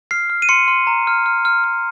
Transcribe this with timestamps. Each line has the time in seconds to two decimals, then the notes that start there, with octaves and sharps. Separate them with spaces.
0.11 F6 C7
0.30 F6
0.42 D#7
0.49 C6 C#7
0.68 C6
0.87 A#5
1.07 F6
1.26 F6
1.45 F6
1.64 F6